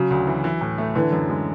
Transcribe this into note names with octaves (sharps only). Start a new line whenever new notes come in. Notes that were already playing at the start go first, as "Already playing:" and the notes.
Already playing: C#3 F#3
D2
E3
E3
A2
A3
D3 E3
F#2
G#3